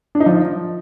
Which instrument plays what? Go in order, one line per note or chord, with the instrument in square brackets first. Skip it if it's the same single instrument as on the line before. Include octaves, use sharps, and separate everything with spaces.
[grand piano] D4
D#4
F3